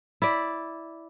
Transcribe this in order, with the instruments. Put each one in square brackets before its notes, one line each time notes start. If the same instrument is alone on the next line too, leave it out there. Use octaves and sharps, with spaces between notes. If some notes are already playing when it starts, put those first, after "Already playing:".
[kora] E4 D5